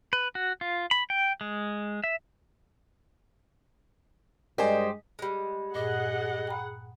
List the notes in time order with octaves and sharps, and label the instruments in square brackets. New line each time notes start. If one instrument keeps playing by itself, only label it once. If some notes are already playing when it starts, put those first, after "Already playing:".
[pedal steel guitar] B4
F#4
F4
B5
G5
G#3
E5
[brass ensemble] G2 G#3 [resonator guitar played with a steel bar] G4 C5 [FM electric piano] A#4 D5 G#5 [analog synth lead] D#5
[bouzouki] G3 G#3
[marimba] G2 A#2 [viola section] G#4 F#5 [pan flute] D#5
[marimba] G5 A#5 B5